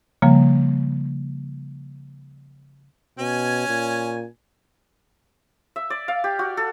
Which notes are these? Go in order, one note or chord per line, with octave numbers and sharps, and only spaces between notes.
C#3 F3 G3 A#3
B2 C#4 G#5
A#2
E5
D5
F5
G4
F#4
A4